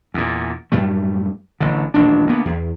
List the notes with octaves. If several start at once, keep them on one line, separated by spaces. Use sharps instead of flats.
E2 A#2
F#2 A2 G3 A3
A1 D3
D#1 A1 D4
D2 A#3 B3
E2